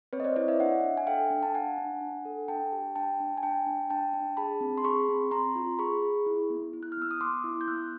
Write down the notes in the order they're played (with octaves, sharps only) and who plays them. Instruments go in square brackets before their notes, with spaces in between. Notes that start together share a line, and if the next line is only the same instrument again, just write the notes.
[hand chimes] C4 B4 C#5
D#5
C5 D5
E4 C#5 D#5
D5 E5
D4 E5 F#5
D4
G#5
A4 F5 G5
D4
A5
D4 F#5 G#5
D4
D4
A4
D4 G5 A5
G4
D4 G5 A5
D4
G#5
D4 G5 A5
D4
D4 G5 A5
D4
G#4 A5 B5
C4
C6
G#4 B5 C#6
C4
C4 A#5 C6
F4
G#4 B5 C#6
G#4
E4
B3
E4
F#6
F6
B3 E6
D#6
B3 C6 D6
E4
G6
B3 E6 F#6